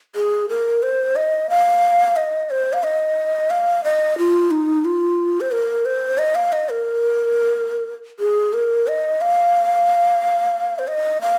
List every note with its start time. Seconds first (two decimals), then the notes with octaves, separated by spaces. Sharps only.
0.16 G#4
0.49 A#4
0.83 C5
1.16 D#5
1.50 F5
2.16 D#5
2.50 C5
2.73 F5
2.83 D#5
3.50 F5
3.84 D#5
4.18 F4
4.51 D#4
4.85 F4
5.41 C5
5.52 A#4
5.85 C5
6.18 D#5
6.35 F5
6.52 D#5
6.69 A#4
8.19 G#4
8.53 A#4
8.87 D#5
9.21 F5
10.79 C5
10.88 D#5
11.21 F5